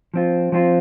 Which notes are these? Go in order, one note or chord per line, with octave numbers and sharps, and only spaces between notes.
F3 C4 F4
F3 C4 F4